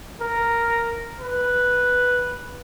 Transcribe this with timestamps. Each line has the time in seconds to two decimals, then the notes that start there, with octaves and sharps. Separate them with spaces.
0.21 A#4
1.20 B4